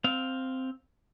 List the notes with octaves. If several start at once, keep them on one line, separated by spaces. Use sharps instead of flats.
C4 F5